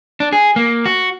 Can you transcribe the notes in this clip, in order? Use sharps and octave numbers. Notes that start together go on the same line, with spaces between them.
D4
G#4
A#3
F#4